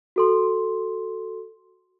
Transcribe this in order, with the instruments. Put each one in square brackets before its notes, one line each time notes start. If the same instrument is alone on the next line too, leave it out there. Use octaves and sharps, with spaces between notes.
[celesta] F#4 A4 C6